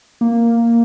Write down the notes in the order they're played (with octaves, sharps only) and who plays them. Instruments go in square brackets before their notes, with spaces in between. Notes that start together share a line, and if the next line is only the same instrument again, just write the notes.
[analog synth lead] A#3